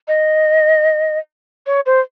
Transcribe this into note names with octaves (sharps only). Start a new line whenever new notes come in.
D#5
C#5
C5